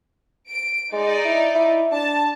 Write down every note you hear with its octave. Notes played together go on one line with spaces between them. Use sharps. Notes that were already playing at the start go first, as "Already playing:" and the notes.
D7
G#3 D#4 D5
E4
E4
D4 A5